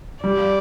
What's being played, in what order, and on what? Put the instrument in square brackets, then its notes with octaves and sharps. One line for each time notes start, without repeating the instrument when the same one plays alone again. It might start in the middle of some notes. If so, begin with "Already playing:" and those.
[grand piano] G3 [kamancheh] D5